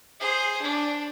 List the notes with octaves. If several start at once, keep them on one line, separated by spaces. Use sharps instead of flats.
G#4 C5
D4